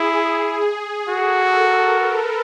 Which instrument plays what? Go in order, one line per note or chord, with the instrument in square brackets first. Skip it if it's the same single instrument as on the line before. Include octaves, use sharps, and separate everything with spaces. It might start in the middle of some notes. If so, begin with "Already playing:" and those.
Already playing: [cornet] E4 [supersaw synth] G#4
[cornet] F#4 [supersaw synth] A4
[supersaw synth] A#4
B4